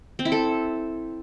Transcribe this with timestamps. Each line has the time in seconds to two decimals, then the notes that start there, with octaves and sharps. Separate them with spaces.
0.19 C4
0.25 E4
0.32 A4